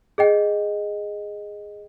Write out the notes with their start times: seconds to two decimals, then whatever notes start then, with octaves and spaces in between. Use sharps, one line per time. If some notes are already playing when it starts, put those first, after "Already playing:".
0.18 G#4 D#5 G5